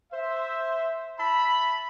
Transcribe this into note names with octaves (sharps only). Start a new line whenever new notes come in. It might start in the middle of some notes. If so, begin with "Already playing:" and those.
C5 E5
E5 A5 B5